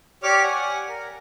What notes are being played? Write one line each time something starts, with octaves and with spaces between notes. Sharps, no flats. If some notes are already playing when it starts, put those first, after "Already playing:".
G4 C#5 D5 D6 F6
F#5 G#5
A#4